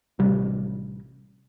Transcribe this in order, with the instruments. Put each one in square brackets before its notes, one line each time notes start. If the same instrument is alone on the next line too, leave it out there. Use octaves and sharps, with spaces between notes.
[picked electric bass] A1 C3 G3